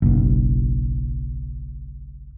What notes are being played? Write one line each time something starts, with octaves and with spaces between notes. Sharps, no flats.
F#1 B1